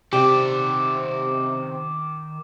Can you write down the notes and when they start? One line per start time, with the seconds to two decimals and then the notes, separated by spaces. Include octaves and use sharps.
0.13 C3 D#3 G4 D5 D6